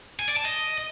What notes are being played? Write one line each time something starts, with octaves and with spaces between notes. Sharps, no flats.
G#5
D5
A5
D#5